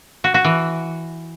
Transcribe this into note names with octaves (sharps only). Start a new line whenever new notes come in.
F#4
F#4
E3